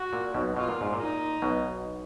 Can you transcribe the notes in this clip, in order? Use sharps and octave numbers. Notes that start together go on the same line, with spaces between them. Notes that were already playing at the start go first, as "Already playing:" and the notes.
Already playing: F#4
A#2
B1 B2
B2 F4
A#2
G#2
A#2
D#4
B1 B2